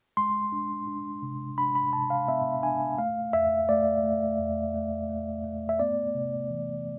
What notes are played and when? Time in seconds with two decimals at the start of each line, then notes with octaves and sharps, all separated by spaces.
0.17 G#3 C6
0.52 D4
0.87 D4
1.23 C3
1.58 D4 B5
1.75 B5
1.93 C3 A5
2.10 F5
2.28 B3 E5
2.63 D4 G#5
2.98 A3 F5
3.33 E2 E5
3.69 A3 D5
4.04 A3
4.39 E2
4.74 A3
5.09 A3
5.44 A3
5.69 E5
5.79 B3 D5
6.15 C3
6.50 E3